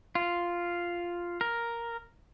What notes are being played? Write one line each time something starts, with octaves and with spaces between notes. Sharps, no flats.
F4
A#4